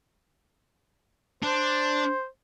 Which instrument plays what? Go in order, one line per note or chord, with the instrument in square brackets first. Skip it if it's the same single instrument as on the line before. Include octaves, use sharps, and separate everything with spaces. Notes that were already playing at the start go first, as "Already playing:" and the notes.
[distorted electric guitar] D4 [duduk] C5